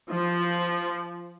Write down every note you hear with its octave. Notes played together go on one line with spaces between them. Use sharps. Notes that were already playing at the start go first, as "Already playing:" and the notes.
F3